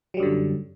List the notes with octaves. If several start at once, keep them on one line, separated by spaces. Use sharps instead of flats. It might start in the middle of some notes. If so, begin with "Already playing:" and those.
F#2 D3 F#3 G3